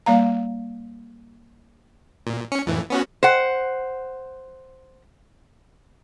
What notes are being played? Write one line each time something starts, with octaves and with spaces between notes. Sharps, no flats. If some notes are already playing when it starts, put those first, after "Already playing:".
G3 A#3 F5 A#5
A#2
C#4 C#7
F2 A2 E3
B3 C#4 F#4
C5 F#5